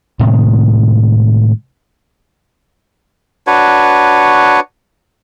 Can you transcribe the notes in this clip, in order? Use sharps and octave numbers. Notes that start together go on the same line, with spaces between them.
A2 C3 D#3 G#3
D4 F#4 B4 C#5